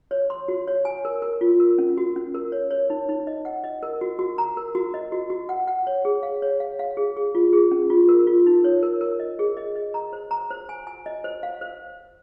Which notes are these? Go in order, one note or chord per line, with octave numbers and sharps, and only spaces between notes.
C#5
C6
F#4
C#5
G#5
A#4
A#4
F4
A#4
C#4
F#4
C#4
A#4
C#5
C#5
D#4
D#4
D#5
F#5
D#5
A#4
F#4
F#4
A#5
A#4
F#4
D#5
F#4
F#4
F#5
F#5
C#5
G#4
F5
C#5
F5
F5
G#4
G#4
F4
G#4
C#4
F4
A#4
F4
D#4
C#5
A#4
A#4
D#5
G#4
D#5
D#5
A#5
C5
A#5
C5
G#5
G#5
D#5
C5
F5
C5